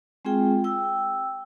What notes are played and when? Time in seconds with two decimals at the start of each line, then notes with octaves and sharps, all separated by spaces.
0.25 G#3 C4 F4 G#4 G5
0.64 G5 E6